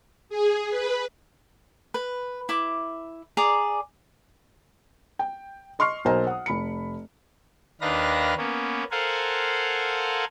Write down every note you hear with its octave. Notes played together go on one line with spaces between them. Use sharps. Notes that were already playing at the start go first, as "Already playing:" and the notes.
G#4
B4
B4
E4 D6
G#4 D5 A#5 D6
G5
D#5 C6 C#6 F6 C7
B1 A#3 C5 D#5 G#5 A#5
F#5 D#6
F1 B5 C#7
D#2 D#3 D4 B4 F5 A#6
A#3 B3 C#4
A4 A#4 C5 F5 F#5 G#5